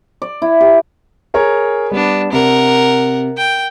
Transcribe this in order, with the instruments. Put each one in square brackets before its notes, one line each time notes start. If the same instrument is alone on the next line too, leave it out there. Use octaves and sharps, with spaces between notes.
[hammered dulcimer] D5
E4
G4
[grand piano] G#4 A#4 C#5
[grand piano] G3 [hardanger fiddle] B3 D4
[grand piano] C3 [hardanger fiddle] A#4 F#5
[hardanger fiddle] G5